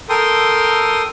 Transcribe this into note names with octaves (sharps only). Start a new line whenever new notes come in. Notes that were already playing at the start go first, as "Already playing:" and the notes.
A4 A#4 G5 C6 D#6